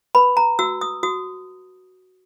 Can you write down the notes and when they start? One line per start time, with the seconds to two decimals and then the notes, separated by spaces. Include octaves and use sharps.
0.15 B4 B5
0.37 A#5
0.59 F#4 E6
0.81 D#6
1.03 F#4 D#6